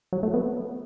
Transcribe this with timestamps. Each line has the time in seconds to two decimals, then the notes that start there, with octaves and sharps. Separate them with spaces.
0.13 F#3
0.23 A3
0.34 B3